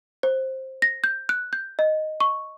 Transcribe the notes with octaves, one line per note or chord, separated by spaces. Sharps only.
C5
A#6
G6
F#6
G6
D#5
C#6